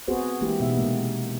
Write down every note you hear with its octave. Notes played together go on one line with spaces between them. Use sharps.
B3 C4 F#4 G#4 B4 C5
E3 G#3 A#3 E4 G4
B2 B3 D#4 E5
C3 G#3 A#3